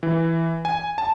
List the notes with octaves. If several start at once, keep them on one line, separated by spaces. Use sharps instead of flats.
E3
G#5
A5